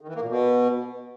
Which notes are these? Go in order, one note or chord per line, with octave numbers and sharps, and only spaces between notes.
D#3
E3
A#3
A#2
B2